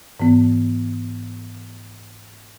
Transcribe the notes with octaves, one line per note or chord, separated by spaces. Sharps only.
G#2 E3 B3